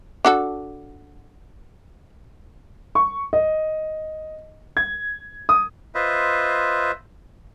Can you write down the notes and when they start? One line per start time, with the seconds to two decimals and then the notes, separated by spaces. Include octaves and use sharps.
0.25 D4 F#4 A4
2.95 C#6
3.33 D#5
4.77 G#6
5.49 D#6
5.95 F4 B4 C5 D#5 E5